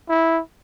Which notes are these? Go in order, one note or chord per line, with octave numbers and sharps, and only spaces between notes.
E4